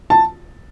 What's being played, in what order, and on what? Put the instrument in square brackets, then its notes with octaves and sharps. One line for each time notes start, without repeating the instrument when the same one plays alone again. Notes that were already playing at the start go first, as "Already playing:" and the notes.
[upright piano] A5